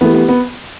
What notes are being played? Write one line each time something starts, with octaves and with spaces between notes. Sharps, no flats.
E3 A3 B3 G4
B3
B3